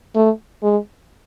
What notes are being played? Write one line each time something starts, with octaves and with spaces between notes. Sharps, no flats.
A3
G#3